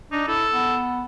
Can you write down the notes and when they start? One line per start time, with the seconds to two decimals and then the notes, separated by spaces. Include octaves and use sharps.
0.12 D4 D#4
0.28 E4 A4
0.52 B3